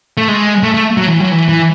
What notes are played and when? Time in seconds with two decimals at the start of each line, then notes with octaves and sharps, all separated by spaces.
0.17 A3
0.28 G#3
0.63 A3
0.74 A3
0.97 F#3
1.09 E3
1.20 F#3
1.31 E3
1.49 E3